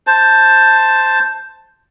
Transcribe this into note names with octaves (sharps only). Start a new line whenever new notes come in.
C5 A5